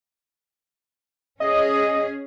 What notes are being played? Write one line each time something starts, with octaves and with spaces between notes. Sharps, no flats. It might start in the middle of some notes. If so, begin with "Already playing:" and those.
C#4 G#4 D#5